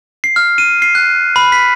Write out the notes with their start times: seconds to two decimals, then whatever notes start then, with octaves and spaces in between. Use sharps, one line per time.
0.24 C7
0.36 F6
0.58 D#7
0.82 C7
0.95 F#6
1.36 B5
1.52 B6